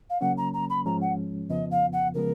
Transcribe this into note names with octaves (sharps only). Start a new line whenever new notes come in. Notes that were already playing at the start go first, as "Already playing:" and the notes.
F5
C#3 F#3 A#3 C#4 F#5
A#5
A#5
B5
G#2 F3 G#3 C#4 A#5
F#5
F2 C#3 F3 B3 D#5
F5
F#5
C#3 F3 G#3 B3 A#4